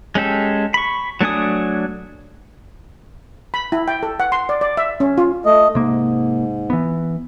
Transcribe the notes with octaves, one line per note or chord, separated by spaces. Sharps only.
G#3 C#4 G4 A4
B5 C#6
F#3 A3 D4 G#5 D#6
B5
E4
G5
A4
F#5
C6
D5
D5
E5
C#4
F4
A3 D#5
G#2 C3 A#3
E3 B3